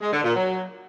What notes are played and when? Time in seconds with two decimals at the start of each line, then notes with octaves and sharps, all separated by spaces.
0.01 G#3
0.13 D3
0.24 A#2
0.35 F#3